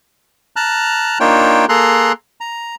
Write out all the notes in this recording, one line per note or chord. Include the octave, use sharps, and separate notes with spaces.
A5 A#5 F6 F#6
A#3 D4 D#4 F4 C#5 G5
A#3 G#4 A4 A#5 C6 F#6
A#5